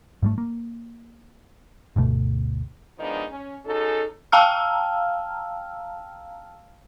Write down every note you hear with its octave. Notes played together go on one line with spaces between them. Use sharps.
G#2 G3 A3
A#3
G1 D2 B2 A3
D#3 F3 G#3 B3 D4 D#4
C#4
C#4 D#4 F#4 G#4 A4
F5 G5 A5 A#5 E6 F6